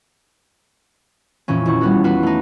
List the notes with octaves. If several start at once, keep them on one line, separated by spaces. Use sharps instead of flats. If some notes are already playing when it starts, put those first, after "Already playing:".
F2 A#2 E3 C#4
D#1 E4 C#6
G3 B3 F#4
E2 F4 F#4 B4
A3 D#4